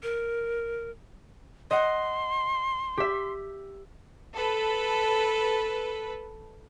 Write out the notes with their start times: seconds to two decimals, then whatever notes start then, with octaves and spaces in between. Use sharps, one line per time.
0.03 A#4
1.71 D#5 F#5 C6
2.97 G4 E5
4.34 A4 B4